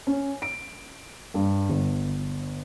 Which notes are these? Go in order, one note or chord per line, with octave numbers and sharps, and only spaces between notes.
C#4
D7
G2
G1